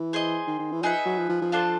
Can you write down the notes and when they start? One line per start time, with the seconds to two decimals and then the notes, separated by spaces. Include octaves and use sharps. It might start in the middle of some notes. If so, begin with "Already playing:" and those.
Already playing: E3
0.13 G#4 C5 D#5
0.47 D#3
0.59 D#3
0.72 E3
0.83 F3 D#4 G#4 B4 E5
1.06 F#3
1.18 F3
1.29 F3
1.42 F3
1.52 D4 F4 A4 C5